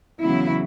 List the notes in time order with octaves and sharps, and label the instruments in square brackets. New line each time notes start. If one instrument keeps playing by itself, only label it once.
[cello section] E2 C#3 F#3 E4